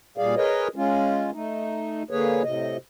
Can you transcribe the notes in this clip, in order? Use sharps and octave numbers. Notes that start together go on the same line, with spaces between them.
A#2 G3 G#4 D5 F5
G#4 A#4 B4 C#5 D#5
G#3 C#4 F4
A3 D#4
D3 A#3 G#4 B4 C#5
A2 C3 D#5